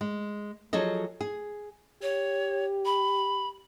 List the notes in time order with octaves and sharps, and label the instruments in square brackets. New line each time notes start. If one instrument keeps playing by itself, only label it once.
[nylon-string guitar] G#3
F3 F#3 G#4 A4 D#5
G#4
[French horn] G4 [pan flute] C#5
[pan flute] B5